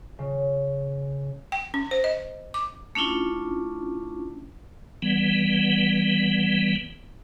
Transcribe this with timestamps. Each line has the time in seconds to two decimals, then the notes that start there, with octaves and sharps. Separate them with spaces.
0.19 C#3
1.52 G5
1.74 C#4
1.91 C5
2.04 D#5
2.54 D6
2.95 A3 C#4 D4 E4 F4
5.02 E3 G3 B3